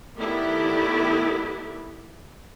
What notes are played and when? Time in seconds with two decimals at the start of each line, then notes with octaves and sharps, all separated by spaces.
0.18 D#3 A3 B3 E4 G4 D5